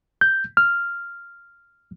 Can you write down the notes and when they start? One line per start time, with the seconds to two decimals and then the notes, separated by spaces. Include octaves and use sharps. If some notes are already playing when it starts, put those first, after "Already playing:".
0.21 G6
0.57 F6